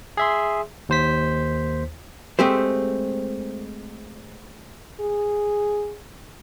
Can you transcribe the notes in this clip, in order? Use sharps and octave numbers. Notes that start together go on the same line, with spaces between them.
G#4 E5 C6
D#2 C5 B6
G#3 A3 C4 G4 C5
G#4